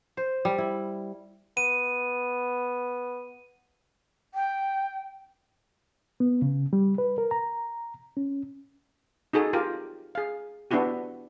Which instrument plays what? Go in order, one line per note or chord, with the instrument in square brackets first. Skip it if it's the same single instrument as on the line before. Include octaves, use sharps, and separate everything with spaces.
[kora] C5
G3
E4
[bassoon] B3 [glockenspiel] D#7
[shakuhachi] G5
[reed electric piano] B3
C#3
G3
B4
A#4
A#5
C#4
[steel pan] D#4 F#4 G#4 A4
F4 G4 A#4
G#4 F5
B3 D4 E4 F#4 G4